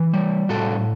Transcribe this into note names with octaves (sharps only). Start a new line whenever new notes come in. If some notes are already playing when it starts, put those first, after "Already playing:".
Already playing: E3
G3
A2 F#4 A4